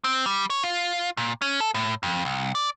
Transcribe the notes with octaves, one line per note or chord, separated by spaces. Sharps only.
C4
G3
C#5
F4
A#2
C#4
A4
A2
F2
C2
D5